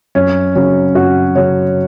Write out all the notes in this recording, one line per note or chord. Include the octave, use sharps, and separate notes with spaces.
F#2 C#4
C#3 F#3 C#4
F#2 F#4
C#3 F#3 C#5